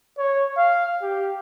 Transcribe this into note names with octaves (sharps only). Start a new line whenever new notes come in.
C#5
F5
G4